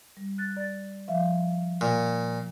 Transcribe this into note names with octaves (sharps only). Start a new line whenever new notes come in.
G3
F#6 A6
D5 A6
F3 E5 F5
A#2